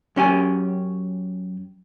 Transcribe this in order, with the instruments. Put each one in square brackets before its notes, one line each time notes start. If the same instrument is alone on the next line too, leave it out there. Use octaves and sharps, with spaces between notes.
[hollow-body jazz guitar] F#2 C#4 G4 G#5